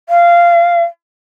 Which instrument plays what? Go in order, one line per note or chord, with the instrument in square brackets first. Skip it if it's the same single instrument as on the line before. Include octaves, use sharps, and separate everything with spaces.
[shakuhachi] F5